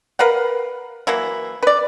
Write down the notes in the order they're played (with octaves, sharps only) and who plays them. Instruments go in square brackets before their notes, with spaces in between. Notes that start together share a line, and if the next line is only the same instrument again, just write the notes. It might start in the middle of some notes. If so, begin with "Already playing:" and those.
[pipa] A#4 B4 F5 F#5
E3 F#3 A#3 E4
B4 D5